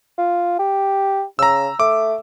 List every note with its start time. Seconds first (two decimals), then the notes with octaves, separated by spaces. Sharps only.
0.18 F4
0.59 G4
1.39 C#3 A#5 E6
1.80 A3 D6